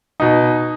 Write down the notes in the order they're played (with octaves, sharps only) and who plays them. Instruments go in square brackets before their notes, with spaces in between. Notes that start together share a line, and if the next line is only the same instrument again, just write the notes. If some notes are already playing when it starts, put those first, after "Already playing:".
[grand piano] B2 D#4